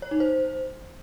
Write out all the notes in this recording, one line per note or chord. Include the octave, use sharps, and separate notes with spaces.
C#5
D#4
C5